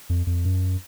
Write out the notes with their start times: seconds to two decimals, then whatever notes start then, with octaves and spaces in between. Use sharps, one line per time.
0.09 F2
0.27 F2
0.45 F#2